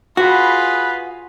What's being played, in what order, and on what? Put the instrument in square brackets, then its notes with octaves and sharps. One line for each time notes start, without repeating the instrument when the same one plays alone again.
[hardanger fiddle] F4 G#4 [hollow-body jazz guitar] F#4 [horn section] B4 B5